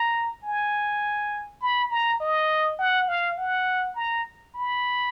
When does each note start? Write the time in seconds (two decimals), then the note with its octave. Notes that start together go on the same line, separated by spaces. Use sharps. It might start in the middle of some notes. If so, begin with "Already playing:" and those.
Already playing: A#5
0.44 G#5
1.62 B5
1.91 A#5
2.20 D#5
2.79 F#5
3.08 F5
3.38 F#5
3.96 A#5
4.56 B5